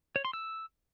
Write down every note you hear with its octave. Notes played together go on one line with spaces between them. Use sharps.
C#5
C6
E6